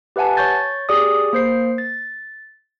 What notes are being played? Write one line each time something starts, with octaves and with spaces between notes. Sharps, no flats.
G4 B4 E5 F#5 G#5 A5
C#5 C#6 G6 A6
G4 G#4 D5 D#6
A#3 C5 C7
A6